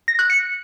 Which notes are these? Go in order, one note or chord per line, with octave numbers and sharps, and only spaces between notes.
A#6
F#6
C#7